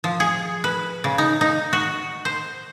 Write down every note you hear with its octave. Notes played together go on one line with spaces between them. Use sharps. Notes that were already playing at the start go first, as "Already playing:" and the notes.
F3
G#4
B4
C#3
D#4
D#4
F#4
C5